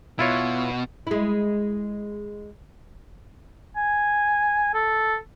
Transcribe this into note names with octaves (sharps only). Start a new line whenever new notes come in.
B2 E4 F4 C#5
G#3 E4
G#5
A4